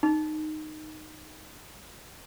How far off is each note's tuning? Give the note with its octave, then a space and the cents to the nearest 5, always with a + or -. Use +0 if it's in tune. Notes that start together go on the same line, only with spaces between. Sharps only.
D#4 -10